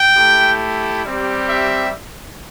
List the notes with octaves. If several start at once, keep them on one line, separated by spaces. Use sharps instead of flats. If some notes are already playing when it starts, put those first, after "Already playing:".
Already playing: G5
A3 E4 G4
G3 C4 G4
E5